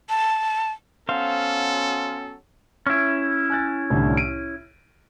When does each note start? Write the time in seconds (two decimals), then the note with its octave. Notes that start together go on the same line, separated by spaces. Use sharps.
0.09 A5
1.09 F#3 B3 C#4 A4 C5 F5
2.86 C#4 E4
3.50 G#5 F#6 A6
3.90 C2 A2 D3
4.17 D7 D#7